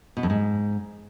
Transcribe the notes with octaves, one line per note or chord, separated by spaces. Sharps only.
B2
F2
G#2